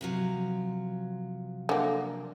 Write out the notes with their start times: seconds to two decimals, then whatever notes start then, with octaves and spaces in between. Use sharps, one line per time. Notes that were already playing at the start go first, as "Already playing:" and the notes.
0.01 C3 F3 F#3
1.69 D3 A#3